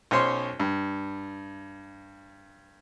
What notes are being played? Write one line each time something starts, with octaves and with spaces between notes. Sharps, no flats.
B1 C#4 C5 C#5 C6
G2